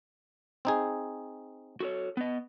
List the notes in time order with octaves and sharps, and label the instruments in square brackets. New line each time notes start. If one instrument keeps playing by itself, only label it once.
[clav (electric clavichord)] C4 D#4 G#4
[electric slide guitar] F#4 A4 C#5
B3 D#5